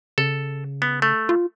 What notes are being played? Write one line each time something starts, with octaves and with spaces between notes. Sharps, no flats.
C#3 A4
B3
A3
F4